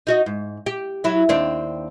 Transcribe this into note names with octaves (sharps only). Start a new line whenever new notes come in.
D#4 F#4 D#5
G#2
G4
F#3 E4
D#2 C4 D4